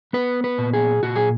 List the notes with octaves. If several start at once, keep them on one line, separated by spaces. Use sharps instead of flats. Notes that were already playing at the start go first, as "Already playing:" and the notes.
B3 B4
B4
A#2
G#4
A#2 F#4
G#4